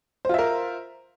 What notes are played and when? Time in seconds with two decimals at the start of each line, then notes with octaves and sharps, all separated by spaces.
0.25 C5
0.29 F4
0.34 E5
0.39 A#4